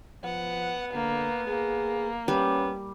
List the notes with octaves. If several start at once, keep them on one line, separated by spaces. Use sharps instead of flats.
F3 B3 F#5
D3 A#3
A#3 G#4
G3 B3 C#4